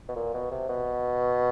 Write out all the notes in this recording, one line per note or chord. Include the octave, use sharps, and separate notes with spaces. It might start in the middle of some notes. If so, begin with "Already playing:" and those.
B2
A#2
B2
C3
B2